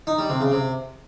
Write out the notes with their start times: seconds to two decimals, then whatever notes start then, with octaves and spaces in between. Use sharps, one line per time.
0.07 D#4
0.18 G3
0.29 C3
0.40 C#3
0.52 C3